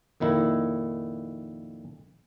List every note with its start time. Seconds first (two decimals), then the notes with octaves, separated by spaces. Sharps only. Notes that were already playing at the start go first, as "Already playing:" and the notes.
0.20 F2 A#2 D#3 E4